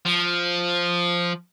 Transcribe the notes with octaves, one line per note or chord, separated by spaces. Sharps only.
F3